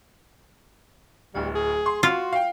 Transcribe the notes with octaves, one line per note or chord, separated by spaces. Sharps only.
D1 D2 G3
G#4
C6
F4 F#4
F5 G5